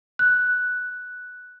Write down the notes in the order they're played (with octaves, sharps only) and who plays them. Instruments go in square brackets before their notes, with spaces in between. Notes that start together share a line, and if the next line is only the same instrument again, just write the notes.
[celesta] F#6